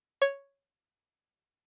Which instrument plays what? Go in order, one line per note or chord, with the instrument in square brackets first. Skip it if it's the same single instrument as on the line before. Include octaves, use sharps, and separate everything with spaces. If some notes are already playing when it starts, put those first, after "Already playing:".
[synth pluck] C#5